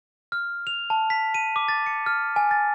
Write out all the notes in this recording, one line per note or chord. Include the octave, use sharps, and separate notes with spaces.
F6
F7
A5
B6
D#7
D6
A6
C#7
F6
G#5
A6